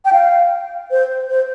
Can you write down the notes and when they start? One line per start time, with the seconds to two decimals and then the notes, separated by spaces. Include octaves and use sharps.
0.05 G5
0.13 F5
0.91 C5
1.29 C5